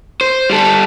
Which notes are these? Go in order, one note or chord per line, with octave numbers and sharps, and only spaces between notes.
C5
G3 A4